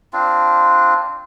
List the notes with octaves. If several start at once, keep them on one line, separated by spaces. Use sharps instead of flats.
C4 D4 F4